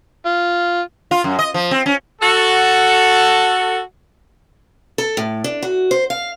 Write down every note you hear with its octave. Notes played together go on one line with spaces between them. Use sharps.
F4
F4
F#2
D#5
F3
C4
C#4
F#4 A4
A4
A2
D4
F#4
C5
F5